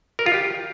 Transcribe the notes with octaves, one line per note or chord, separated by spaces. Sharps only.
A#4
F4
G4